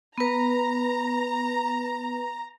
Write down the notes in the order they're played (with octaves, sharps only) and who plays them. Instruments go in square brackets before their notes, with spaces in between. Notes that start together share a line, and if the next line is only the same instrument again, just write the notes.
[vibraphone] B3 B4 [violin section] A#5